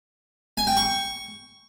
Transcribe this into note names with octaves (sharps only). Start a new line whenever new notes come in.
G#5
G5
C#6